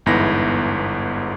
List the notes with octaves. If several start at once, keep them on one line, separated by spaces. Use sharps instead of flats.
G1 E2 G#2 B3 E4 A#6